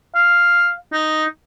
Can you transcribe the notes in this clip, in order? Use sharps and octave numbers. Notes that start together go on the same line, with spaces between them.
F5
D#4